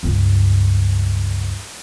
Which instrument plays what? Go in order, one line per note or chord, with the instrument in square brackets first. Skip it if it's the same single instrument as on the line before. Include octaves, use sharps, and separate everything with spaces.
[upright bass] C#2 G2